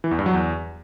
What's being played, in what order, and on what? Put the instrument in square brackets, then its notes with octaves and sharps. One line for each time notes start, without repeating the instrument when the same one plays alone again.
[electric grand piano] E3
E2
G2
F#3
E2